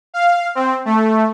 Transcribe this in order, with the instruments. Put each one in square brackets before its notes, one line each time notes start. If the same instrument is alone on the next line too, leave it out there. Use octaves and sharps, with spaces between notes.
[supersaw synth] F5
C4
A3